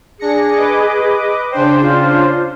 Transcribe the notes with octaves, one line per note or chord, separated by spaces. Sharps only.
D4 G#4 A#6 C#7
B4 D#5 D6
C#3 D4 C5 G5
F4